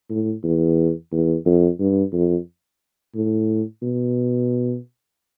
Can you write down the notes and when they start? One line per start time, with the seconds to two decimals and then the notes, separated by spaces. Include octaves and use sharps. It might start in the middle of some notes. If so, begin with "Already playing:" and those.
0.10 A2
0.44 E2
1.12 E2
1.46 F2
1.79 G2
2.13 F2
3.15 A2
3.82 B2